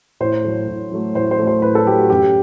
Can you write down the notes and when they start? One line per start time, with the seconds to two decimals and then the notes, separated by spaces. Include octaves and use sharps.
0.20 A2 C5
0.44 F#3 A3
0.68 A2
0.92 F#3 A3
1.15 A2 C5
1.31 C5
1.39 F#3 A3
1.47 C5
1.62 A2 B4
1.75 A4
1.86 F#3 A3 G4
1.98 F#4
2.10 F#2 G4